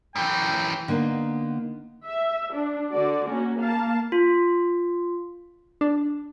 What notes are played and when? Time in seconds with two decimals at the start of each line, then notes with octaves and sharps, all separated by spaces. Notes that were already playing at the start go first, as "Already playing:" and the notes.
0.16 F#2 E3 G5
0.88 D3 A#3 B3 D#4
2.06 E5
2.56 D4
2.91 D3 F#4 D5
3.28 A#3 C#4 F#4
3.58 A#3 F5 A5
4.12 F4
5.81 D4